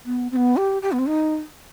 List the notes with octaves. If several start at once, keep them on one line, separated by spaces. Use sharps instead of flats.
B3
C4
B3
G4
G4
B3
C4
D#4